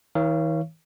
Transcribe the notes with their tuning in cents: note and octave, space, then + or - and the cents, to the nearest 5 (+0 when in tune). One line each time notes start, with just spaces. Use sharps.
E3 -45 C#5 +0 F5 -35